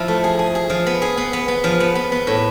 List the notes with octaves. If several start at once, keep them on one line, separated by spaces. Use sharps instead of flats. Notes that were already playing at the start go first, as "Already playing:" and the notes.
Already playing: F3 E4
A3
G#4
G#4
G#4
F3
B3
G#4
B3
B3
B3
F3
B3
B3
B3
A2